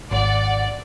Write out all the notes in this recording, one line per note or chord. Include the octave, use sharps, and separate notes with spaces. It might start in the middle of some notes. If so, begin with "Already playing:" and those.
G#1 D5 F#5